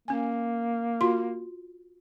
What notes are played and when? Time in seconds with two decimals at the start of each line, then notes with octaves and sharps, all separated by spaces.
0.08 A#3 C#4 G#5
1.01 F4 F#4 C6